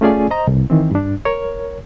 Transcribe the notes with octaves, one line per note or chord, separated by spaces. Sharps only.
A3 C#4 F4 G#4 D5 G#5
C5 D#5 A#5
C2
D#3 E3 C4
G2 D4
A#4 C#5